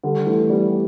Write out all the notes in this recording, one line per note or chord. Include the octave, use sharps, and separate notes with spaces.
D3 G3
E3 A3
G3 B3